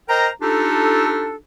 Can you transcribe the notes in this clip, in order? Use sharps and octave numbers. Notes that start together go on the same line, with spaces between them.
A#4 C5 D#5 G5 A#5
D4 D#4 F4 G4 A4